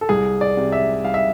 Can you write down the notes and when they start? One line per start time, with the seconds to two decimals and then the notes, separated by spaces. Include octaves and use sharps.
0.01 A4
0.09 C2 G#4
0.41 D5
0.57 C3
0.72 E5
1.04 G3 F5
1.14 E5